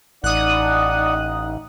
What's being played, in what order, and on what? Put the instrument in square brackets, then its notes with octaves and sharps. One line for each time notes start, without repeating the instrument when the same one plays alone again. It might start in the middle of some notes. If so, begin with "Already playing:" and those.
[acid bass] A1 [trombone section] D#4 [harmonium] D5 F#5 [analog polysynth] D#6 F#6